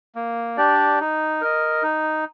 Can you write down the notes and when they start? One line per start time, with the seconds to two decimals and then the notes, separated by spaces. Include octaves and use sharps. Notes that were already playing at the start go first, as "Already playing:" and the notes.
0.15 A#3
0.57 D4 G4 D5
1.00 D#4
1.41 A#4 D#5
1.83 D#4